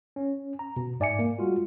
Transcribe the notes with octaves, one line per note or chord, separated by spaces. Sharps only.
C#4
A#5
B2
G#2 D5 E5 G#5 D6 C#7
A#3
G3 G#3 F4 F#4